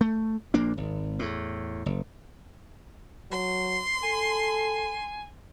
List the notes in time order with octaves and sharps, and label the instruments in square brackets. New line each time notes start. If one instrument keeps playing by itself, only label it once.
[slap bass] A3
A#1 A#2 A#3 D4
G#1
E2 A2
F#1
[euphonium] F#3 [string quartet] C6
[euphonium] A4 [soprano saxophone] G#5